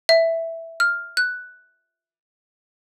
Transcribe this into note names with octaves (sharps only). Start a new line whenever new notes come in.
E5
F6
F#6